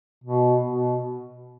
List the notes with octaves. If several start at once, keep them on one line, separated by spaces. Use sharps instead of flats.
B2
B2